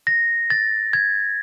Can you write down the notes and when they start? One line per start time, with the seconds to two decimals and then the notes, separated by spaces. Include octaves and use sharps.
0.07 A#6
0.50 A6
0.93 G#6